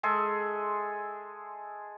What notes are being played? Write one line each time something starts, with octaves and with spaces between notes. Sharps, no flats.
G#3 G#4 A4 E5